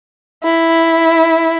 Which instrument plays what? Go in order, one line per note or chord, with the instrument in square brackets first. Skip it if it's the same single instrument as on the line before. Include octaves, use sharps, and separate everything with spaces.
[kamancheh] E4